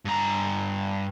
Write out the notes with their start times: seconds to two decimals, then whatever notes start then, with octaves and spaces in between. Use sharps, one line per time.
0.05 G2 A#5